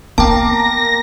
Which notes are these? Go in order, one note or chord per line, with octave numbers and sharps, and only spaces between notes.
A#3 B3 G5 A5 D6 A#6